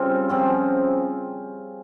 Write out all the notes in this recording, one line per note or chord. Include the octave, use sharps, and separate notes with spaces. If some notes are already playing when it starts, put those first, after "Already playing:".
Already playing: C#3 G3 C4 F4
C#3 F3 C4